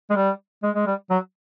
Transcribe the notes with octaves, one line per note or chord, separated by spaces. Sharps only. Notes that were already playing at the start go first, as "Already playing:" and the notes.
G#3
G3
G#3
G#3
G3
F#3